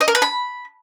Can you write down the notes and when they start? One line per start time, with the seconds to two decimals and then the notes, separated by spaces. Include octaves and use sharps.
0.01 D#5
0.08 A#4
0.15 B4
0.22 B5